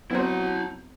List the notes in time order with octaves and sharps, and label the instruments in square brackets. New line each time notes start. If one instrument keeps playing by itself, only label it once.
[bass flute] F#3 [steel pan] B3 C4 C5 [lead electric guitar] E4 A#5